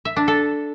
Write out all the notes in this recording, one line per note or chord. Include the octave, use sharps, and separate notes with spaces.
E5
D4
A4